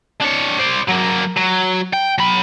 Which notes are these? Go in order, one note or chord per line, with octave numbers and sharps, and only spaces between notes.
D4 C#5
C5 D5
F#3 A#3
F#3
G5
F#3 B5